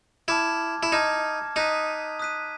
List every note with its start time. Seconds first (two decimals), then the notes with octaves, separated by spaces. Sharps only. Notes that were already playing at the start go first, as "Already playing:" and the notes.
0.28 E4 A5 D6 F6 G#6
0.83 E4
0.92 D#4 A5 D6 F6 G#6
1.56 D#4 D#6 F#6 B6 D#7
2.19 D#6 F#6 B6 D#7